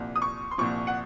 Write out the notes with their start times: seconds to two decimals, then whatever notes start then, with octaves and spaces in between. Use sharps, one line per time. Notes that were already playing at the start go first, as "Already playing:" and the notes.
Already playing: C2 A#2 F3
0.16 D#6
0.22 C#6
0.51 C6
0.58 C2 A#2 F3 C#6
0.87 F#5